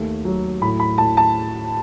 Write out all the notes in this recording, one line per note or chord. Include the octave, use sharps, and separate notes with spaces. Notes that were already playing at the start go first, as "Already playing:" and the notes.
Already playing: D#2 A3
F#3
A2 B5
B5
A2 A5
A5